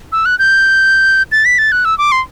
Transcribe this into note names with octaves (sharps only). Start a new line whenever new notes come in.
E6
F#6
G6
A6
B6
A6
F#6
E6
D6
C6